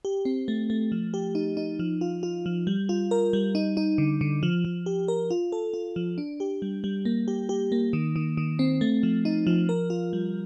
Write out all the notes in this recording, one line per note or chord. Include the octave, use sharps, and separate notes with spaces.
G4
C4
A3
A3
F3
G4
D#4
D#4
F3
F4
F4
F3
G3
F4
A#4
G3
D#4
D#4
D3
D3
F3
F3
G4
A#4
F4
A4
F4
F3
D4
G4
G3
G3
A#3
G4
G4
A#3
D#3
D#3
D#3
C4
A3
F3
D#4
F3
A#4
F4
G3